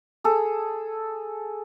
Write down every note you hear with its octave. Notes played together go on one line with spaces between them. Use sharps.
G#4 A4